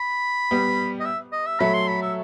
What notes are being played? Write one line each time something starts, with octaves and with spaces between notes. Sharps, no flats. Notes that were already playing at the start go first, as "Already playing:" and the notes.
Already playing: B5
G3 B3
D#5
E5
D#5
E5
F#3 A3 B5
C6
B5
E5